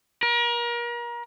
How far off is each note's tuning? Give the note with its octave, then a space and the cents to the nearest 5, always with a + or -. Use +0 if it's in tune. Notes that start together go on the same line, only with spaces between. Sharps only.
A#4 +35